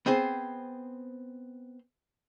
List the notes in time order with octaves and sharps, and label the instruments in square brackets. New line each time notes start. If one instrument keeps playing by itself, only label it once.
[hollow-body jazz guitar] B3 C4 G#4 C5